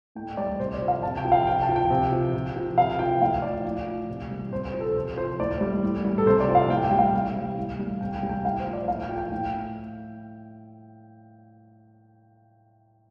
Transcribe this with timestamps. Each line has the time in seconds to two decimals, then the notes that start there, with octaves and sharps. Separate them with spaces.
0.15 A2 G5
0.37 G3 D5
0.59 C3 C5
0.74 D5
0.82 F3
0.88 F5
1.03 C3 A5
1.17 G5
1.25 F3
1.32 F5
1.46 C3 G5
1.62 A5
1.69 F3
1.76 G5
1.90 C3
2.12 F3
2.34 C3
2.56 F3
2.77 C3 F5
2.99 F3 G5
3.21 A2 F5
3.42 F3 D5
3.65 A2
3.86 F3
4.09 C3
4.31 G3
4.51 C3 C5
4.67 C5
4.74 F3
4.80 A4
4.96 C3 C5
5.17 F3 C5
5.39 A2 D5
5.61 G3
5.83 A2
6.05 G3
6.18 A4
6.26 C3 C5
6.40 D5
6.48 F3
6.55 F5
6.70 A2 G5
6.85 G5
6.91 G3
6.99 F5
7.13 C3
7.36 G3
7.57 A2
7.79 G3
8.01 C3 G5
8.16 G5
8.23 G3
8.29 G5
8.44 A2 F5
8.60 C5
8.67 F3
8.73 D5
8.88 A2 F5
9.03 G5
9.09 F3
9.18 G5
9.32 A2